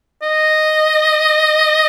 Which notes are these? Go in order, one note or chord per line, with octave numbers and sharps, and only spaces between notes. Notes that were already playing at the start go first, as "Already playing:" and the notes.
D#5